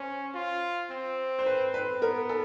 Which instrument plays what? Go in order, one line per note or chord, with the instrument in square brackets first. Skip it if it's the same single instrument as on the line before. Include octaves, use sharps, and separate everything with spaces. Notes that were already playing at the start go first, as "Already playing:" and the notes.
Already playing: [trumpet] C#4 [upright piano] C5
[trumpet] F4
C4
[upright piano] C5
B4
B4
[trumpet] B3 [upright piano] A#4
[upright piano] A4